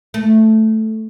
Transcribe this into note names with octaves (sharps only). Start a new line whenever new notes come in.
A3